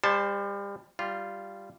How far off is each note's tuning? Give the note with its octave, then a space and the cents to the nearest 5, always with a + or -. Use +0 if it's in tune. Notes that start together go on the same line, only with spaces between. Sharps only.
G3 +35 C5 +0 A5 -5
G3 +0 F4 -10